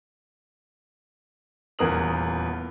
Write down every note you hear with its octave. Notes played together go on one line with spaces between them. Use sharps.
D#1 E2 B3 A#4 D#6 F#7